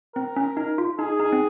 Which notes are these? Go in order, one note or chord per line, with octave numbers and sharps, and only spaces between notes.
C4 A#4
C#4
D#4
F4
D#4 G#4
D#4
C4